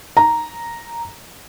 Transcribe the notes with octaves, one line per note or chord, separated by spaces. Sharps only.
A#5